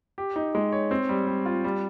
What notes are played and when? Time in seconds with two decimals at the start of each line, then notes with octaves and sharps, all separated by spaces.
0.18 G4
0.36 D#4
0.55 G#3
0.72 C#5
0.91 C4
1.09 G3
1.27 G3
1.46 F4
1.64 G3